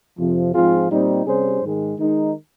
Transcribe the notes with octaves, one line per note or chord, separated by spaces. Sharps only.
F2 C3 F3
G#2 F3 C4 F4 G#4
A#2 G3 C4 D#4
C3 G3 C#4 G#4 C5
G#2 D#3 G#3
D#3 G#3 D#4